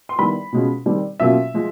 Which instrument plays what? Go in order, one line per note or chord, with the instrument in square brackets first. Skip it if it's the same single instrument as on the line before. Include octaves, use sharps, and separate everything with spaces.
[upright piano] C6
D#3 G3 B3 E4 B5
B2 G#3 C#4 F4
D#3 G3 C4
B2 F#3 A#3 C#4 F4 E5
F3 G#3